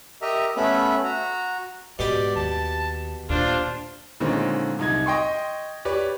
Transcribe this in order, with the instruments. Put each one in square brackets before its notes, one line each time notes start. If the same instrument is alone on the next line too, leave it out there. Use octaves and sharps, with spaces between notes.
[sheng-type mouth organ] G4 A#4 D#5 E5 A#5
A3 B3 C#4 E5 B5
F#4 A#5
[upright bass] G#2 [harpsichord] B2 G4 [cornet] D5
[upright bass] D#2 [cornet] A5
[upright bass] D#2 A#2 [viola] D4 C5 [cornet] F4
[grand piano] A#2 D3 D#3 G#3 C4 C#4
C2 D#4 G#6
D#5 G5 C6 C#6
G4 B4 C#5 D5